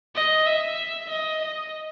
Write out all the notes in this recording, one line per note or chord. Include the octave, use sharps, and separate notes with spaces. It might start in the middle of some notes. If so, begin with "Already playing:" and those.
D#5
E5
D#5
D#5